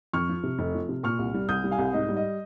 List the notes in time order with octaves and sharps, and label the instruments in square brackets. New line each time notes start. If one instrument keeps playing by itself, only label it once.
[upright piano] F2 C#6 F6
F3
C3
F1
F3
C3
A#2 C#6 F6
C2
G3
C2 D#6 G6
G3
F5 G#5
C2
G#2 D#5
G3
D#5